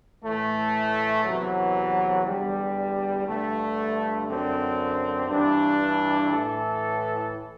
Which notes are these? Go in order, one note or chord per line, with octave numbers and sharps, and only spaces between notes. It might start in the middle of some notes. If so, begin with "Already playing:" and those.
A2 E3 A3
E2 C3 E3 F#3
E2 D3 G3
G2 D3 A3
F#2 D3 C4
G2 E3 D4
A2 E3 A4